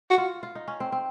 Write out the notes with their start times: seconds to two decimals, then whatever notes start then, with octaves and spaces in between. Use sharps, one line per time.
0.10 F#4
0.18 F4
0.43 F4
0.55 D#4
0.68 C#4
0.80 C4
0.92 C4